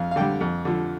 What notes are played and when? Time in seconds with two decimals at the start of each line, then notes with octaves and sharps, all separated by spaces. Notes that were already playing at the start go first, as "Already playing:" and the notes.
Already playing: F2 F5
0.11 F5
0.16 D3 G3 G5
0.41 F2
0.65 D3 F3